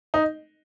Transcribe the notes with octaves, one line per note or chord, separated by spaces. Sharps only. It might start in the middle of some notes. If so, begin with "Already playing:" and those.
D#4